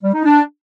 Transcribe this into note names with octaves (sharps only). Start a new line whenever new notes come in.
G3
D#4
D4